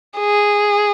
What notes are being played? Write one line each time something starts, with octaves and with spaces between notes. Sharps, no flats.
G#4